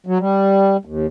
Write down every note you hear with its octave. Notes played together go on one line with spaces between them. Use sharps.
F#3
G3
D#2